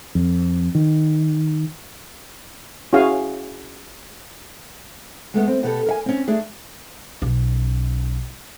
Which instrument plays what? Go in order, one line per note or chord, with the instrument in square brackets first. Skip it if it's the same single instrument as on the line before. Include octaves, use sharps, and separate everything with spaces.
[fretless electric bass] F2
D#3
[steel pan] C#4 E4 F#4 G#4 F5 G#5
[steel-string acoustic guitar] G#3 A3 B3
C4
B2 B3 G4 A4
A#4 E5 G#5
C4 C#4
A3 D4 G#4
[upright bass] B1 C#4